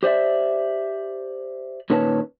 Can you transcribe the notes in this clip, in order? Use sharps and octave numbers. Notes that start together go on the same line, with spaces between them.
G4 C5 D5 E5
A#2 D#3 C#4 B4 C#5 A5